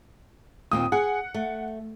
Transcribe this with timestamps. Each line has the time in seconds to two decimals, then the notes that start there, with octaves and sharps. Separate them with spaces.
0.71 D#2 A#2 C4 D#6
0.92 G#4 F#5
1.34 A3